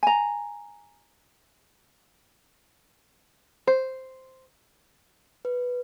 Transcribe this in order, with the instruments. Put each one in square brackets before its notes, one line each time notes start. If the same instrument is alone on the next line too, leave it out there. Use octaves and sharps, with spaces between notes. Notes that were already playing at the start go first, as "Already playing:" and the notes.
[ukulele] G#5 A#5
[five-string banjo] C5
[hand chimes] B4